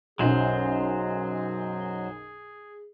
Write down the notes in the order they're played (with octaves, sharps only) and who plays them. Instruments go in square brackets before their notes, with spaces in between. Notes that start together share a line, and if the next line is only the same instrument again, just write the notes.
[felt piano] B1 F#2 [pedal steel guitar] F#3 C5 [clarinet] G#4